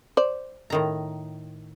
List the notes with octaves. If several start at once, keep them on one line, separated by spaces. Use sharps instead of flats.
C5 D5
A2 D#3 A#5